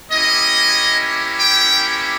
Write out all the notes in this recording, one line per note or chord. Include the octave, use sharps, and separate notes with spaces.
A#3 C#4 E4 G4 D#5
G5